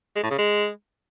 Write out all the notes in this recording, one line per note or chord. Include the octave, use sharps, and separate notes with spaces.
G#3
A2
C#3
G#3